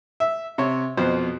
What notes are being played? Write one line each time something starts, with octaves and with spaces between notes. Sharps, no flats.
E5
C3 C#5
F2 B2 C5